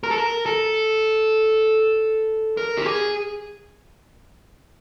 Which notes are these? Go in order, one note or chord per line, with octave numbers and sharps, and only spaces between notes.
A#4
A4
A#4
A4
A#4
G4
G#4